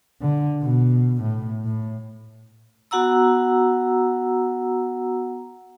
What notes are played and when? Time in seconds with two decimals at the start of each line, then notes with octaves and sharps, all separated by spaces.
0.21 D3
0.62 B2
1.23 A2
1.65 A2
2.91 B3 F#4 F#5 A#5 E6